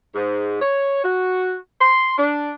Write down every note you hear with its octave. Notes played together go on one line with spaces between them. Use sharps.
G#2
C#5
F#4
C6
D4